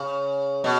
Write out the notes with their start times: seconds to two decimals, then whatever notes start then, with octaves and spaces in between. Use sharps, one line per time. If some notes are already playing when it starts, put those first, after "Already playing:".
Already playing: C#3
0.64 B2